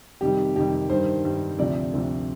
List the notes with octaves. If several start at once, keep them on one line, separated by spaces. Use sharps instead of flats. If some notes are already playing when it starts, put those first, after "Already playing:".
F2 C3 D#3 G3 G4
F2 C3 D#3 G3 G4
G2 D#3 G3 C5
G2 D#3 G3
D2 C3 F3 D5
D2 C3 F3